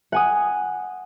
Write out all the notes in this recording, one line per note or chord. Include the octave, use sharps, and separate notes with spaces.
F#5 G#5 D#6